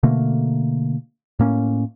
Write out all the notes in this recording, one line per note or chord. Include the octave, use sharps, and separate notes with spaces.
B2 D3 A3 A#3
A2 A#3 C#4